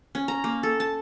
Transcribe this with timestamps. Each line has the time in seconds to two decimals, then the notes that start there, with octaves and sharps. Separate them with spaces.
0.15 C#4
0.28 A#5
0.44 A#3
0.63 A4
0.80 A5